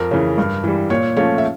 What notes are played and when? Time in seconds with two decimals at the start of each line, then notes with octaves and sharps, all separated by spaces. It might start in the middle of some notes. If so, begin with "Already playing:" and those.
Already playing: F2 A#4
0.11 C#3 E3
0.38 G2
0.64 E3 G3
0.90 A#2 C#5
1.17 F3 A3 C#4 C#5
1.38 E5